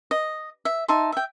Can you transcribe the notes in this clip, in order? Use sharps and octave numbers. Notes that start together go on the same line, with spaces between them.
D#5
E5
D#4 E5 A5 C6
E5 G5